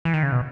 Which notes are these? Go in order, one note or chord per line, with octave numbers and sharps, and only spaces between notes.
E3
D#3
C#3
B2